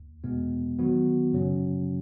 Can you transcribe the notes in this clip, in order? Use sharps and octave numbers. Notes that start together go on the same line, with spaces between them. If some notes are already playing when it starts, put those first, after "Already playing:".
Already playing: D#2
E2 B2 G#3 B3
D#3 F#3 B3 F#4
F#2 C#3 F#3 C#4